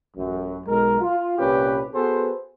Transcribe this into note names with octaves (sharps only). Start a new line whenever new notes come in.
A1 F#2
B1 G#3 A#4
F4
C2 A#2 C#4 G4 B4
B3 F#4 G#4 A4 B4 C5